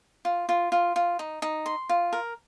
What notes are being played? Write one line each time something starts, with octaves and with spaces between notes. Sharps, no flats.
F4
F4
F4
F4
D#4
D#4
C6
F4
A#4